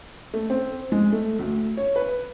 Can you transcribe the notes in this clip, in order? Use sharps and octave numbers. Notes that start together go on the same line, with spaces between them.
A3
C4
G#3
A3
D2
C#5
B4